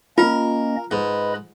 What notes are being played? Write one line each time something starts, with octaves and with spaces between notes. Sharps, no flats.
A#3 C#4 F4 A#4 D#5
G#2 B4 D#5 B5